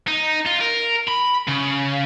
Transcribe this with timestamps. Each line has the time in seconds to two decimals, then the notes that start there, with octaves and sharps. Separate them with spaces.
0.07 D#4
0.46 F4
0.61 A#4
1.08 B5
1.48 C#3